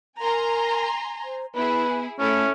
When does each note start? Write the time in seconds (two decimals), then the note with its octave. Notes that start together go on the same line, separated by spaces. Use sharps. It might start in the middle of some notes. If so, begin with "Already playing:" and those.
0.21 A#4 G#5 A#5 C6
1.24 C5
1.55 B3 E4 G#4 B4
2.19 A3 C#4 E4 A4